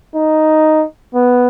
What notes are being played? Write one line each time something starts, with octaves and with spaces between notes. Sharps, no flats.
D#4
B3